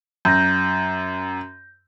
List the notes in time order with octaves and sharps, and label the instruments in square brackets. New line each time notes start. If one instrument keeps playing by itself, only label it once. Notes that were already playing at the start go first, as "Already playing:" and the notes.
[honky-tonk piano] F#2 [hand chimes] G6 A#6